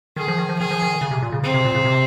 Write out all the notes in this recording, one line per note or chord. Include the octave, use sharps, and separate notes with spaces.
D#3 G#4
F3
D#3
F3
D#3 G#4
F3
D#3
C#3
C3
A#2
C#3
C#3 C4
C3
A#2
C#3
C3